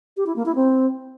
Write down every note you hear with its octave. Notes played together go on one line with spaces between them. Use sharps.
G4
E4
A#3
E4
C4